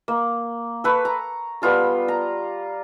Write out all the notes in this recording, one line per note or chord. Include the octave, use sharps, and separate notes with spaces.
A#3
A4 B4 C#6
A#5
G3 B3 F4 A4
A#5